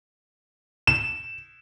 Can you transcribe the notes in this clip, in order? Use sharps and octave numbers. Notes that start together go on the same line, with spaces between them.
E7